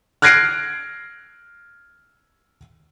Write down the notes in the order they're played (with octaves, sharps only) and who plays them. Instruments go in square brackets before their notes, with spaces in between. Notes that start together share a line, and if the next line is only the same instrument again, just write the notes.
[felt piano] F6 F#6 G#6 A#6 C7 D7